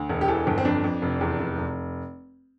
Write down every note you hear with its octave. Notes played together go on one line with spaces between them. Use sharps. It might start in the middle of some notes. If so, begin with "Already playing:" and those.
Already playing: D2
E1
G4
E3 A4
G1
C4
F2 D4
F2
F1
E2
F1
F1